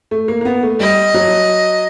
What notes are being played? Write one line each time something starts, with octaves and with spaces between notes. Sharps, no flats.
A3
A#3
A#3
B3
A3
G3 D#5
F#3